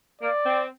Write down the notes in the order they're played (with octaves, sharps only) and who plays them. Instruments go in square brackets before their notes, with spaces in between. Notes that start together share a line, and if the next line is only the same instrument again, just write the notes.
[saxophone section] A#3 [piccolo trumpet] D5
[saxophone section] C4